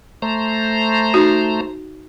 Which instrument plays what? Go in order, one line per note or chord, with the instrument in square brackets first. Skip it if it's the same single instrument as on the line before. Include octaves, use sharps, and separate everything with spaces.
[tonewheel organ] A3 C5 A#5
[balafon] D#4 F#4